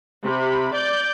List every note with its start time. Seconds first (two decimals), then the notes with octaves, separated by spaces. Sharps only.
0.23 C3 B5
0.75 D5 G6